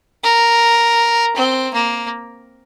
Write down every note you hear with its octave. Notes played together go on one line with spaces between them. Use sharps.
A#4
C4
A#3